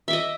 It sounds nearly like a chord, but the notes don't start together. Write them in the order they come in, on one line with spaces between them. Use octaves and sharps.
E5 D6 D#5